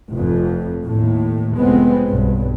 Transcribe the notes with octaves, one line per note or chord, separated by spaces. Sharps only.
F1 F2
D#2 A2
F1 G#3 B3 C4
B1 G2